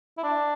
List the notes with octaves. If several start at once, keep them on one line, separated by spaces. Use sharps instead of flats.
E4
D4